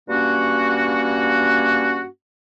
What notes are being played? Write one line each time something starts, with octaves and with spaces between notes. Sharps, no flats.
G2 A#3 C#4 F#4